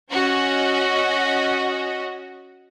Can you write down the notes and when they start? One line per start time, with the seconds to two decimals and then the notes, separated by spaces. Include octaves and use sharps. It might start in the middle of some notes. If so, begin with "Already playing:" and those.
0.11 C#4 F#4 D#5